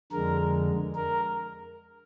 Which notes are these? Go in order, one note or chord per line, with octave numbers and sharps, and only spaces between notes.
F2 D3 G#3 A#4
A#4